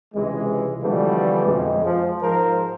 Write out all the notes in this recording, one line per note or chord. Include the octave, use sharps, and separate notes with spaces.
C#2 C3 E3 G#3
B2 D3 E3 F3 G3 A3
F2 G#3
F3
G#2 F3 G#4 A#4 C5